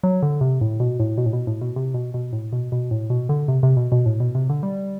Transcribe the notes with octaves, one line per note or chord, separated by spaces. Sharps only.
F#3
D3
C3
A2
B2
A2
B2
A2
B2
A2
B2
C3
B2
B2
A2
B2
B2
A2
B2
D3
C3
C3
B2
B2
A2
B2
C3
D3
G3